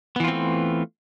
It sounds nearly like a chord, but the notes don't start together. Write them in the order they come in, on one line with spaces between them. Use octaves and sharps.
B3 E3 F4 C4 A3